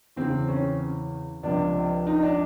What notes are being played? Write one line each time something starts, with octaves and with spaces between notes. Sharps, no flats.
E2 C#3 E3 C4
C#4
C#2 C3 F3 D4
D#4
D4